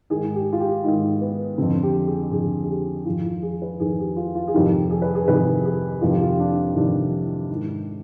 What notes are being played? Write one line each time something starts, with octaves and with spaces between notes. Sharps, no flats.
G#2 D#3 G#4
G4
F4
G4
G#2 D#3
B3
F2 D3 C4
G4
G#4
F2 D3 G#4
G#4
G4
F2 D#3 F4
F4
G#4
B4
F2 D#3 G#4
G4
F4
F4
G#4
F2 C3 D#3 G4
G#4
B4
G#4
F2 C3 D#3 B4
G#4
F2 C3 D#3 F4
G4
F4
D4
F2 C3 D#3 D4
G#2
D#3